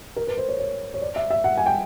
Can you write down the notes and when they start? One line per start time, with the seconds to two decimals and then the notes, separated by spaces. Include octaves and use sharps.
0.16 A#4
0.27 B4
0.37 C5
0.49 C#5
0.59 C#5
0.94 C#5
1.01 D5
1.16 E5
1.31 E5
1.44 F#5
1.58 G#5
1.66 G5